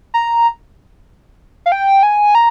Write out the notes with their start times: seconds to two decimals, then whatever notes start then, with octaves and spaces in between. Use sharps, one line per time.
0.14 A#5
1.66 F5
1.72 G5
2.03 G#5
2.35 A#5